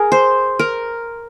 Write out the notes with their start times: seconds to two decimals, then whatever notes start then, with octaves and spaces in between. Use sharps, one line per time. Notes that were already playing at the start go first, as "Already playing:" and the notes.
Already playing: G#4 A#4
0.12 C5
0.59 A#4